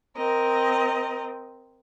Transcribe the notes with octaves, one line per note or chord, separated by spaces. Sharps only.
C4 A#4 D#5